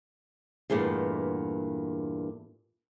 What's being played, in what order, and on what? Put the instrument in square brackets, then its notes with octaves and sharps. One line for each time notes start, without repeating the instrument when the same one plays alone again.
[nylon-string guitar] E2 G2 A#2 A3 B3